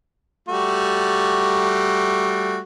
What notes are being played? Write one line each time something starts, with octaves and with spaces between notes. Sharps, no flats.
G3 A3 F#4